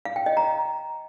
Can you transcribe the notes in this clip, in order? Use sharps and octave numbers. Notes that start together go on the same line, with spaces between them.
F5
G5
D#5
A#5